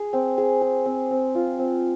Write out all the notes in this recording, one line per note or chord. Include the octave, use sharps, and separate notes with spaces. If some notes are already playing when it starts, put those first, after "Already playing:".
Already playing: G#4
C4
G#4
G#4
C4
C4
F4
C4